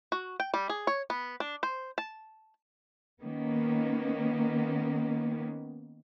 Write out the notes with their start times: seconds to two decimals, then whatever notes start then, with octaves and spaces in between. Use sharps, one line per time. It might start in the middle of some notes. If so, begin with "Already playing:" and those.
0.12 F#4
0.40 G5
0.54 G3
0.69 G#4
0.87 C#5
1.10 B3
1.40 D4
1.63 C5
1.98 A5
3.22 D#3 A#3 B3 C#4